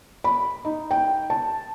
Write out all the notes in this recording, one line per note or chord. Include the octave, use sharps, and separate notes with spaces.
B5
D#4
G5
A5